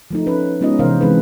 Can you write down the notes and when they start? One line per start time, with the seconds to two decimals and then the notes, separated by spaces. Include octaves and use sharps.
0.11 F3 A3 D#4
0.26 C#4 B4
0.61 G#3 B3 C#4 D#4 F4 D#5
0.79 C3 E3 A#4 C5 F5
1.01 E3 G#3 C4 D#4 G#4 B4